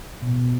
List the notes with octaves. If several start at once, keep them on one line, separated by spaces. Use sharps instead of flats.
B2